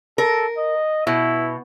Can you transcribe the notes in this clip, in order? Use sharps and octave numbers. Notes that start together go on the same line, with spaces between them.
A4 A#4
D#5
B2 E4